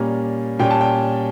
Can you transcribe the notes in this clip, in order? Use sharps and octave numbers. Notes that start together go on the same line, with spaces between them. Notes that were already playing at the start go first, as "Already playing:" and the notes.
Already playing: A#2 G3 A#3 C#4
A#2 G3 C#4 G5
A5
G5